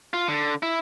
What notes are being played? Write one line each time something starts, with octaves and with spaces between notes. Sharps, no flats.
F4
D3
E4